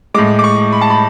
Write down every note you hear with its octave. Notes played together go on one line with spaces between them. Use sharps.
A2 G#3 D6
D6
C#6
B5
A5
B5